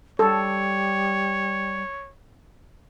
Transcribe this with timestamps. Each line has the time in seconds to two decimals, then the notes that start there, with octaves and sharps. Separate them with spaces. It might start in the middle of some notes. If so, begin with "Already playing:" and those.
0.19 G3 A4 C#5